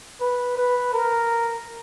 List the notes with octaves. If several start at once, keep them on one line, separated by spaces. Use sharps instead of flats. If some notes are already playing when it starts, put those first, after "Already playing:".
B4
B4
A#4